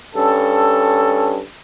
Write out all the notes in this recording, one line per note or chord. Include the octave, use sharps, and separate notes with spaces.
G2 C#4 A4